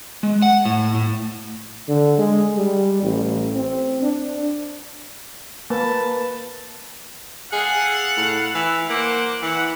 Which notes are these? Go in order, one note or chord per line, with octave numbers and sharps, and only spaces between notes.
G#3
F#5
A2
A2
D3
G#3
G3
A1
C4
D4
A#3 B4 A5
G#4 A4 F5 F#5
A2
E3
A#3 C5 F#5 D6
E3 F#5